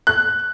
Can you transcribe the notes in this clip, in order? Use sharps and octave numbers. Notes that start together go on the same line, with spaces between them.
F#6